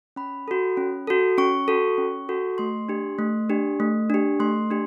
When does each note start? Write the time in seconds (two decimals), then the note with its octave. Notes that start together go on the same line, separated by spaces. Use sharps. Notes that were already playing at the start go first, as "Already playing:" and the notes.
0.16 C#4 B5
0.48 F#4 A4
0.77 C#4
1.07 F#4 A4
1.38 C#4 C#6
1.68 F#4 A4
1.98 C#4
2.29 F#4 A4
2.58 A3 C6
2.89 D4 G4
3.19 A3
3.50 D4 G4
3.80 A3
4.10 D4 G4
4.40 A3 C6
4.70 D4 G4